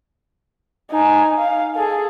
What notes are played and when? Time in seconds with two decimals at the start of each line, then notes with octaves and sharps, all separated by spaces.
0.91 D#4 G#5
1.38 F5
1.75 G#4 A4